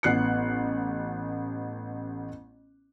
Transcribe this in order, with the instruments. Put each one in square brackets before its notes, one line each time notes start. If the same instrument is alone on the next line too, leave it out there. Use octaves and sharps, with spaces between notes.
[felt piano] A1 B3 F#6 C7 C#7